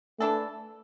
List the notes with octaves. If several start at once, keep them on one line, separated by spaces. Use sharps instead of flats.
E3 A3 D4 A4